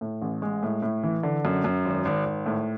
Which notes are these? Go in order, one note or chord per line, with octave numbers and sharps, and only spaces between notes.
A2
A1
G#3
A2
A2
E3
D3
F#2
F#2
G#1
G#1
G#1
A2